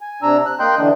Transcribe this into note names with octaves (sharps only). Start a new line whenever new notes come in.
G#5
C3 D4 A#5 E6
F#6
A#3 D#5 G5 C6 F#6 G6
D3 E3 D4